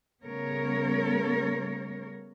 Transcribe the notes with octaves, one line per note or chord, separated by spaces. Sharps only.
C#3 G3 A3 B3 A#4 C#5